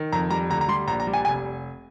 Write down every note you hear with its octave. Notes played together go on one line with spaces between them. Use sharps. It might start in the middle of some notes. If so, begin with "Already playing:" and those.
Already playing: D#3
F2 A#5
G3 A#5
D2 A#5
A#5
G3 C6
A#1 A#5
A#5
G3
G#5
F1 G#5